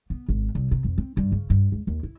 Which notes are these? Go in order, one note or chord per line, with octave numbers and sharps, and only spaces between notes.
B3
G#1
C2
C3
F2
C4
G2
C#3
G2
C#2
D#2
E4